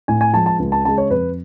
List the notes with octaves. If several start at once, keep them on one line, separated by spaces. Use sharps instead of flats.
A2 G#5
G#5
F3 G#3 A5
A5
C#2
A5
C#3 G#3 A5
C#5
F2 B4